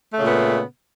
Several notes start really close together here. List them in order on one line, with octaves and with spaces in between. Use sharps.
A3 C#3 A#2 B3